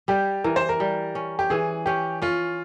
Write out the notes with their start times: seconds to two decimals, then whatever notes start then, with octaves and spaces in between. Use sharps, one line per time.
0.08 G3 G4
0.44 E3 A#4
0.56 C5
0.69 A#4
0.80 G3
1.15 C#4
1.39 G4
1.50 E3 G#4
1.86 C#4 G4
2.22 C#4 F4